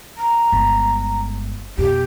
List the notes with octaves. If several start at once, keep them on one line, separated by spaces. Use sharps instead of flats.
A#5
G1 G#3
F2 B2 G4